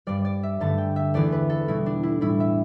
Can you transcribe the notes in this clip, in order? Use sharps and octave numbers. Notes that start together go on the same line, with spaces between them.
G2 G3 D5
D5
E5
G2 D3 A3 A5
G5
E5
E2 E3 A3 D5
B4
A4
B2 G3 E4
D4
E4
A2 G3 E4
E5